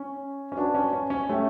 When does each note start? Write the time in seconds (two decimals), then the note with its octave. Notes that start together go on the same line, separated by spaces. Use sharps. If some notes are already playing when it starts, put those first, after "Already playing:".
Already playing: C#4
0.52 C#4
0.57 D4 F#4 B4 F#5 A5
0.75 C#4
0.93 C#4
1.10 C#4
1.29 A3 G4 C#5 E5 G5